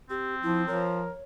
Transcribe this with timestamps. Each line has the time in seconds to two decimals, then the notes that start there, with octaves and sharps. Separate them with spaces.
0.10 C4 G4
0.43 F3 E4
0.68 F3 A#4 C#5